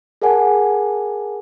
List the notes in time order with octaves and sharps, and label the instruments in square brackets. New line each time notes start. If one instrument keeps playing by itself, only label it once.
[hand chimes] G#4 A#4 D5 F#5 G#5 A5